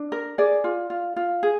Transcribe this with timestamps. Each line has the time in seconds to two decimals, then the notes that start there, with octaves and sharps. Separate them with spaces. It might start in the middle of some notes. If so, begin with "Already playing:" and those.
Already playing: D4
0.12 A#4
0.38 G#4 D5
0.64 F4
0.90 F4
1.16 F4
1.43 G#4